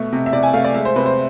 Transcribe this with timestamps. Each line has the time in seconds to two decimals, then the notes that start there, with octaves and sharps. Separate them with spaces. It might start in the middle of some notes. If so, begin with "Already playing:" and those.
Already playing: B2 A3
0.12 C3
0.26 E5
0.33 C3 D5
0.43 G#5
0.54 A3 F5
0.64 D5
0.74 G#3 E5
0.85 C5
0.96 C3 B4
1.06 C5